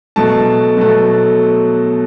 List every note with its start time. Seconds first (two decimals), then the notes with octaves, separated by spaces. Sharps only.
0.16 B2 F#3 A3 A5
0.77 B2 F#3 A3